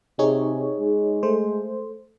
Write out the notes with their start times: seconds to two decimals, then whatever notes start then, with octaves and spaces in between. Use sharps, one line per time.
0.19 C3 D#4 G#4 C#5
0.79 G#3
1.23 A3 C5